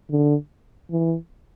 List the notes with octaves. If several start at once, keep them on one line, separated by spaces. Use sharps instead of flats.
D3
E3